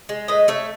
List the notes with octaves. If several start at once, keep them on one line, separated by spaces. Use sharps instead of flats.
G#3
A2 B4 D#5
A3 A4 C#5